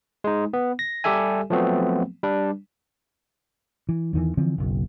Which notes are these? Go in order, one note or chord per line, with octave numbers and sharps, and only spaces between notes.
G#3 D#4
B3
A#6
G3 G4 A4 E5 G#5
F3 F#3 A3 B3 C4
G3 D4
E3
E2 D#3 E3
D3 E3 F3 C4
F#1 B1